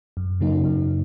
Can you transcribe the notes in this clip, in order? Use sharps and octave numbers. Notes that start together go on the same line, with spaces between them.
F#2
C#3 F#3 A#3 D#4
F#2